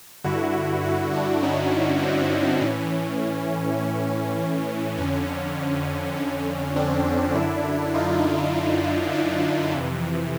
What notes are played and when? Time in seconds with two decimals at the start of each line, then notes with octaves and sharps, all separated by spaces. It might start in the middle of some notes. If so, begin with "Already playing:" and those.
0.24 G2 D3 E4 F#4
0.84 E4 F#4
1.13 D4 E4
1.43 C#4 D#4
2.02 C4 D4
2.61 A2 E3 C#4
3.80 C#4
4.98 F2 D3 C#4
6.17 C#4
6.76 C4 D4
7.35 F#2 D3 D4 E4
7.94 D#4 F4
9.13 D4 E4
9.72 F2 C3 E3